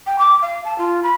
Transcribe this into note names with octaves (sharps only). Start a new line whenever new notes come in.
G5
D6
F5
A5
F4
B5